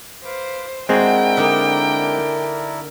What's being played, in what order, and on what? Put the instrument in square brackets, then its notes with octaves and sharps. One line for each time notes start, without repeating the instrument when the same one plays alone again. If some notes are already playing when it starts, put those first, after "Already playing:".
[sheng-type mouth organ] B4 F5 D6 [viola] C5
[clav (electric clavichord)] G#3 C4 G#4 [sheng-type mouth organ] D4 E4 A#4 [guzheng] F#4 [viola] G5
[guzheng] D3 A#3 D#4